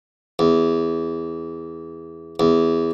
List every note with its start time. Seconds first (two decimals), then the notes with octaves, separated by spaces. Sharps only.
0.39 E2
2.40 E2